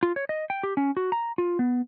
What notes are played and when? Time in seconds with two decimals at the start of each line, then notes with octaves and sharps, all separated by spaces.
0.03 F4
0.16 C#5
0.29 D#5
0.50 G5
0.63 G4
0.77 C#4
0.97 F#4
1.12 A#5
1.38 F4
1.59 B3